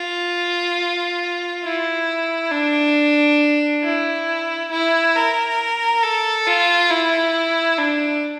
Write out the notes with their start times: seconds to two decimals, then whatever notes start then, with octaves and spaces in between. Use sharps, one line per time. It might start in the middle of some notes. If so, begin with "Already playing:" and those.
Already playing: F4
1.64 E4
2.52 D4
3.84 E4
4.71 E4
5.16 A#4
6.03 A4
6.47 F4
6.90 E4
7.78 D4